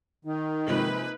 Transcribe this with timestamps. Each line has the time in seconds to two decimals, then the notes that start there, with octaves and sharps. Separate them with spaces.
0.25 D#3 D#4
0.67 C3 F3 G#3 A#3 B4